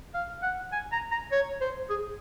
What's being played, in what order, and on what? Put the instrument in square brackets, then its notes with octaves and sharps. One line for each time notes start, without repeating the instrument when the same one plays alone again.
[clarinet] F5
F#5
G#5
A#5
A#5
C#5
C5
G#4